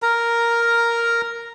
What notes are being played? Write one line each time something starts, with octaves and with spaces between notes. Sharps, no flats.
A#4 A#5